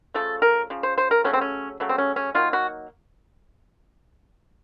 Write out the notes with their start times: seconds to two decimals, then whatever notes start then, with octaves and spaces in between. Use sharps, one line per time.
0.14 C#3 F3 A3 A4
0.42 A#4
0.70 C#3 F3
0.83 C5
0.98 C5
1.11 A#4
1.24 C#3 F#3 A3 C#4
1.33 C4
1.41 C#4
1.80 C#3 F#3 A3
1.89 C4
1.98 C#4
2.16 C#4
2.34 D#3 F#3 A#3 F4
2.53 F#4